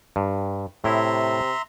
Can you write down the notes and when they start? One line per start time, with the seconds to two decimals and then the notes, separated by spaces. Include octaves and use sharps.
0.16 G2
0.84 A2 C3 E4 E5 A#5 C6